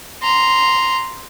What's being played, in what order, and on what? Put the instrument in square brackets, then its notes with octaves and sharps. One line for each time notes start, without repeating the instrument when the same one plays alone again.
[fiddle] A#5 C6